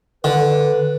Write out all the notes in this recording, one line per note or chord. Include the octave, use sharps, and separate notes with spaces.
D3 B4